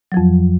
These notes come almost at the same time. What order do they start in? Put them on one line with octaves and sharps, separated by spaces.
F#3 F3 F2